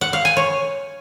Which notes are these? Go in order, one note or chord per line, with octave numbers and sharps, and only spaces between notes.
F#5
F5
G#5
C#5